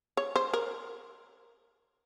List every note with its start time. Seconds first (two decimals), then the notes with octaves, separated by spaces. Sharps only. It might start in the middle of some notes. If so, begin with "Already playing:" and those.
0.17 C#5
0.36 C5
0.53 A#4